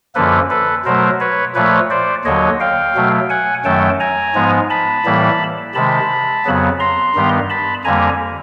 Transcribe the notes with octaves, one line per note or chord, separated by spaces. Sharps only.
F#2 D3 F3 A#3 A4 B4
A4 B4
B2 F#3 A3 A#4 C5
B4 C#5
A#2 F3 A3 B4 C#5
C5 D5
D#2 D3 F#3 C#5 D#5
F5 G5
B2 F#3 A3
F#5 G#5
F#2 D#3 F#3 A3 G5 A5
G#5 A#5
G#2 F3 G#3 B3
A5 B5
A2 E3 G3 A#3
C3 D#3 G#3 A5 B5
F2 C#3 F#3 B3
A#5 C6
G2 D#3 G3 B3
A5 B5
F2 D3 G3 A#3 G#5 A#5